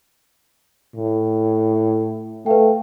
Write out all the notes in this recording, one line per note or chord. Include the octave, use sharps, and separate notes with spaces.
A2
A3 B4 F5 G5